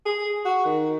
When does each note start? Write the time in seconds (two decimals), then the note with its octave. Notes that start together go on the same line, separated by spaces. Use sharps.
0.06 G#4
0.45 F#4
0.65 D#3